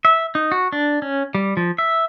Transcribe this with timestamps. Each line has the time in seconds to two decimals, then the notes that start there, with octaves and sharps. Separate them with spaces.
0.05 E5
0.35 D#4
0.52 F#4
0.72 D4
1.02 C#4
1.35 G3
1.57 F3
1.78 E5